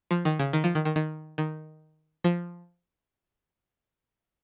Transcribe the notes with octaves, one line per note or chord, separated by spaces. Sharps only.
F3
D#3
C#3
D#3
F3
D#3
D#3
D#3
D#3
F3